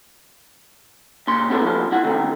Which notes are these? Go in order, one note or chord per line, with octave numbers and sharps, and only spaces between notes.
A#2 C#3 C6
B3 C4 E4 G#4 A4
A2 F3 F4
E4 F#5
C3 D#3 A3